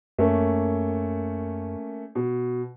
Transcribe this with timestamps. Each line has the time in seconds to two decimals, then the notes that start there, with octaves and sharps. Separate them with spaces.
0.19 F#2 A3 A#3 C#4
2.15 B2